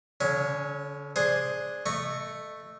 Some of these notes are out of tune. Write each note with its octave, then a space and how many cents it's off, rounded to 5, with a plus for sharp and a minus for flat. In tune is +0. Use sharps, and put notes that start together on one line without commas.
D3 -40 C#4 +0
D4 +0 G#4 +0 C5 +0
A3 +0 D#5 -30 C#6 +0